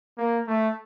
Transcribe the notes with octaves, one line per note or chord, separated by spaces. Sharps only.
A#3
A3